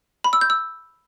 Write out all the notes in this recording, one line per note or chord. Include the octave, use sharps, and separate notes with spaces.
B5
E6
G6
E6